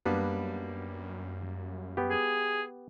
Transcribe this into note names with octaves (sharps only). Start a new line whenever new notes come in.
F#2 G3 A#3 B3 D4 B4
B3 G4
G#4